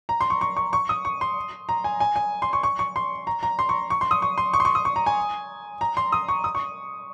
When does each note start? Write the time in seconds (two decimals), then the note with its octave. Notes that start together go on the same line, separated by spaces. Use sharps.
0.09 A#5
0.21 C6
0.30 C#6
0.41 C#6
0.57 C#6
0.73 C#6
0.89 D#6
1.05 C#6
1.21 C6
1.69 A#5
1.84 G#5
2.00 G#5
2.16 G#5
2.42 C6
2.53 C#6
2.63 C#6
2.79 C#6
2.96 C6
3.27 A#5
3.43 A#5
3.59 C6
3.69 C#6
3.90 C#6
4.01 C6
4.11 D#6
4.22 C#6
4.38 C6
4.53 C#6
4.60 C6
4.65 C#6
4.75 D#6
4.85 C#6
4.96 A#5
5.06 G#5
5.81 A#5
5.97 C6
6.12 D#6
6.28 C#6
6.44 D#6
6.55 C#6